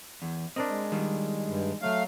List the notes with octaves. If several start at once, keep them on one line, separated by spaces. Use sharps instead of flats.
E2
C4 D4 A#4 D#5
G#3
D#3 G3
G2
F#3 A3 F5